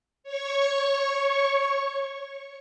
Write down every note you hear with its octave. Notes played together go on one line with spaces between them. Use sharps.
C#5 C#6